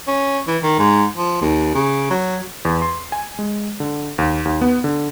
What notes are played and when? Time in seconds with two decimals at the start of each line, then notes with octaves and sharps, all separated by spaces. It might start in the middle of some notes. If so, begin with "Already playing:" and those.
0.07 C#4
0.47 E3
0.63 D#3
0.79 G#2
1.17 F3
1.41 D#2
1.74 C#3
2.10 F#3
2.65 E2
2.82 C6
3.12 G#5
3.39 G#3
3.80 D3
4.18 D#2
4.45 D#2
4.61 B3
4.84 D3